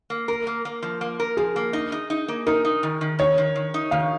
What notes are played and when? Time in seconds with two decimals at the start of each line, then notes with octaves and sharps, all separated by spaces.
0.10 A#3
0.28 A#4
0.47 A#3
0.65 A#3
0.83 F3
1.01 A#3
1.20 A#4
1.37 F3 G#4
1.56 A#3
1.73 D#4
1.92 D#4
2.10 D#4
2.28 A#3
2.47 D#4 A#4
2.65 D#4
2.83 D#3
3.01 D#3
3.19 D#3 C#5
3.38 D#3
3.56 D#3
3.74 D#4
3.91 D#3 F5